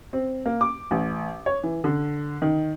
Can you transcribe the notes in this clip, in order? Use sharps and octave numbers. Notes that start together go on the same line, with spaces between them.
C4
A#3
D6
A1
C#5
E3
D3
D#3